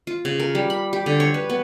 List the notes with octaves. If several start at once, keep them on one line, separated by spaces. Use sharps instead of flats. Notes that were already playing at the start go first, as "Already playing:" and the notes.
F4
C#3
A#4
G3
B5
G4
D3
C#5
B4
B3